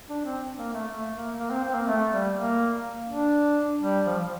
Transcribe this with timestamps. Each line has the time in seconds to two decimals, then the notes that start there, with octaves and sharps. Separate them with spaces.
0.09 D4
0.25 C4
0.58 A#3
0.74 A3
0.90 A3
1.15 A#3
1.39 A#3
1.51 C4
1.64 C4
1.75 A#3
1.87 A3
2.12 G3
2.36 A#3
3.09 D4
3.82 G3
4.06 F3
4.19 F3